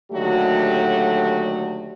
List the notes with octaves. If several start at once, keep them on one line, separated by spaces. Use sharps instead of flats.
D#2 D3 F#3 A3 F#4 G4